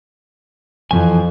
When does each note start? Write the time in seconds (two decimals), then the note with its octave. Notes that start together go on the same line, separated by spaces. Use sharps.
0.91 F2 E3 F3 G#5